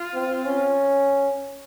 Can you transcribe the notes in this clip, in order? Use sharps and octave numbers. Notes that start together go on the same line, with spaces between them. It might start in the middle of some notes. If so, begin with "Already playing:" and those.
Already playing: F4
C4
C#4